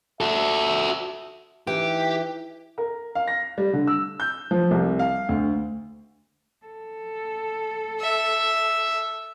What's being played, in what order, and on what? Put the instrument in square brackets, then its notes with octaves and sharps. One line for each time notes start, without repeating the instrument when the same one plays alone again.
[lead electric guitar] F#4 A4 [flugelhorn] E5
[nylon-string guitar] E3 D#4 [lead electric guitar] G4
[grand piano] A#4
F5
A#6
G3
D3
E6
G6
F3
C2
F5
D2
[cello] A4
[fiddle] E5